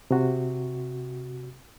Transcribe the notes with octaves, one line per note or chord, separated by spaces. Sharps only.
C3 F#4